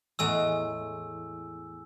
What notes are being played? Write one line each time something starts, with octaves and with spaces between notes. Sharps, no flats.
E2 A2 G#3 G#5 E6